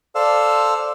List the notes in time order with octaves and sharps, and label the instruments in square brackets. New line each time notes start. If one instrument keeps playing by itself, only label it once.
[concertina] A4 C5 D5 F5 E6